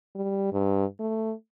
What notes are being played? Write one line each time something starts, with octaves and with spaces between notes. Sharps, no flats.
G3
G2
A3